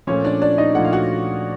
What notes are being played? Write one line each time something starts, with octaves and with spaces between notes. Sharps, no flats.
A#2 F3 A3 C#4 C#5
D4 D5
D4 D5
D#4 D#5
A#2 F3 A3 F#5
F5
F#4 F#5